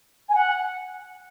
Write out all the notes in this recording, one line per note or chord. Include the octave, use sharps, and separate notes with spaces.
G#5
F#5